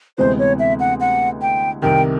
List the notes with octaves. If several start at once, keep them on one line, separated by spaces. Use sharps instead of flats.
D2 C3 E3 G#3 B3 C5
C#5
E5
F#5
F#5
G5
C2 C3 D#3 G5